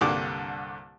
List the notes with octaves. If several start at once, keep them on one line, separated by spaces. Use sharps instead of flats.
C2 G2 D3 A#3 D6